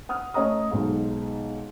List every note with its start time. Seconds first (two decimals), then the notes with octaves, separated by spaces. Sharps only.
0.09 F#5 D#6 F6
0.34 A3 C#4 C#5 D#5 A#5 D#6
0.71 B1 G#2